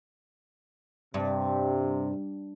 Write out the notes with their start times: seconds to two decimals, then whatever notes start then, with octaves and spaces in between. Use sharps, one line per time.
1.14 G2 C3